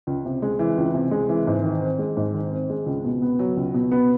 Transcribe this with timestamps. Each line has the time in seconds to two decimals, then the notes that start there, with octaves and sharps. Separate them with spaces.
0.07 C#2
0.25 C3
0.42 G#3
0.59 E3
0.78 C#2
0.94 C3
1.11 G#3
1.29 E3
1.47 G#2
1.64 D#3
1.82 C4
1.99 G#3
2.17 G#2
2.34 D#3
2.51 C4
2.70 G#3
2.86 C#2
3.04 B2
3.22 B3
3.39 F#3
3.57 C#2
3.74 B2
3.91 B3